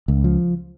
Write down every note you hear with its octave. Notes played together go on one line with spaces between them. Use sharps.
C#2
F3